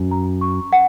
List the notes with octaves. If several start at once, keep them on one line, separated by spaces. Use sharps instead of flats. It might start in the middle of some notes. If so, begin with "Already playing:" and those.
Already playing: F#2
A#5
C#6
F#5